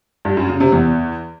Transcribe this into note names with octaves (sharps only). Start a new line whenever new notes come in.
G2
F#2
C#3
C3
E2